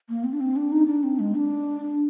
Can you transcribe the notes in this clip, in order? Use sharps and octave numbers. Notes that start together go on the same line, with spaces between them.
A#3
C4
D4
C4
D4
D#4
D4
C4
G#3
D4